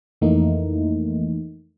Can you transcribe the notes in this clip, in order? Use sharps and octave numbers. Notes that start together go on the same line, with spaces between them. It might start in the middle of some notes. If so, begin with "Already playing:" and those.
F2 E3 A3 A#3 D#4